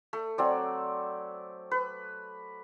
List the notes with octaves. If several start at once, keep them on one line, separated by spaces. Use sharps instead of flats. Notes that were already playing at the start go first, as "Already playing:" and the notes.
A3
F#3 C4 D5
B4